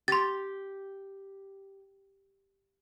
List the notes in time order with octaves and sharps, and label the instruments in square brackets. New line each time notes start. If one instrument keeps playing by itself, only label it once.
[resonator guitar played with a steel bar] G4 [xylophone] C6 A6